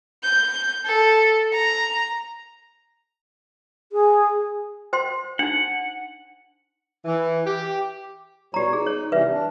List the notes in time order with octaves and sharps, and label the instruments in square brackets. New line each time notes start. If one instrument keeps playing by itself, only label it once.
[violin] G6
A4
A#5
[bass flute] G#4
[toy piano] C5 G5 C6
[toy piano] D4 D#4 [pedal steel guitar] F#5
[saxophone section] E3
G4
[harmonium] B2 G3 C#5 [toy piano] G4 A#5
[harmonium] D#4 [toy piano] G#4
[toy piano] C#5
[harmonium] C3 E3 G3 [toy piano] B4 E5
[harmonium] D4